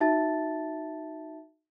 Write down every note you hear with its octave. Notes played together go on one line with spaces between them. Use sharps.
D#4 F#4 E5 A5 A6